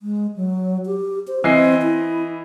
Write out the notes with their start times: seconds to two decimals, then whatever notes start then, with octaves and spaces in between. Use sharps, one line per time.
0.02 G#3
0.36 F#3
0.86 G4
1.28 C5
1.44 E3 C4 D#5 C7
1.82 E4